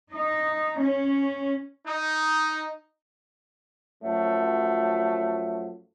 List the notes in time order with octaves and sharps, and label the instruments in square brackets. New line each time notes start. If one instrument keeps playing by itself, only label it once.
[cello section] D#4
C#4
[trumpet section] D#4
[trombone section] F#2 F3 F#3 A3